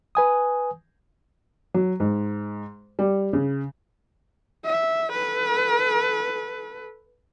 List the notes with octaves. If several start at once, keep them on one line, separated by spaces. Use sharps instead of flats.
B4 G#5 D#6
F#3
G#2
G3
C#3
E5
A4 B4